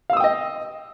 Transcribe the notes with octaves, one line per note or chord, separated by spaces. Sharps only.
D#5 F5 G5 D#6 E6